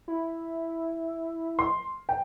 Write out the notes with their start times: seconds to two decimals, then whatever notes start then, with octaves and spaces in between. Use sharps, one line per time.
0.08 E4
1.59 C6
2.09 G5